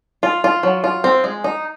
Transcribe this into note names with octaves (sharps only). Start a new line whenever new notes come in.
F4
F4
F#3
F4
C4
G#3
D#4